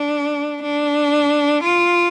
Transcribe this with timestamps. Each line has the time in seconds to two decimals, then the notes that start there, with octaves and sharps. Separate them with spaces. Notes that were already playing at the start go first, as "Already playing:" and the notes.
Already playing: D4
0.63 D4
1.64 F4